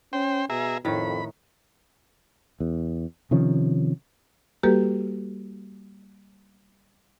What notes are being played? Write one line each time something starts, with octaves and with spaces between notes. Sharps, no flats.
C#4 C5 G5
B2 G#4 E5 A#5
F2 A2 D#3 B5
E2
C3 D#3 F3 C#4
G3 A#3 F#4 G4 A4 B4